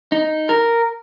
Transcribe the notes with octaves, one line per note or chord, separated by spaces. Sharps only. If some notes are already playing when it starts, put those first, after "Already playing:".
D#4
A#4